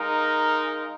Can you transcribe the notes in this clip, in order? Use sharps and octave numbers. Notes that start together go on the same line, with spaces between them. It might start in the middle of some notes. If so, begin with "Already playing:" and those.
Already playing: G#3 D#4 A#4 F5